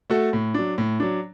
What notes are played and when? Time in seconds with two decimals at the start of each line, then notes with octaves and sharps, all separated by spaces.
0.10 A3 F#4 A4
0.33 A2
0.54 F#3 D4
0.78 A2
1.00 F#3 D4